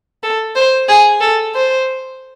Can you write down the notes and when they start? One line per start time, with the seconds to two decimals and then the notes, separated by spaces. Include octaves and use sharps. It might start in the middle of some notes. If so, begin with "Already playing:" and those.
0.23 A4
0.56 C5
0.88 G#4
1.21 A4
1.54 C5